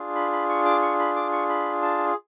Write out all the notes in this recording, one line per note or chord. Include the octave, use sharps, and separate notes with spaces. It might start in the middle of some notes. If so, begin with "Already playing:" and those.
Already playing: D4 F4 G#4
B5
B5
C#6
D6
C#6
B5
D6
C#6
B5
A5